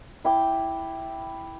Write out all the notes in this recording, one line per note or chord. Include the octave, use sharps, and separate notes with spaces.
E4 G5 D6